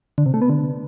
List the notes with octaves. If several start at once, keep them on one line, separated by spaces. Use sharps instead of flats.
D3
C3
A3
B3
D3